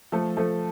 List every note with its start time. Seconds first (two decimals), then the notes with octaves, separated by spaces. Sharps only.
0.12 F3 A3 A4
0.37 F3 A3 A4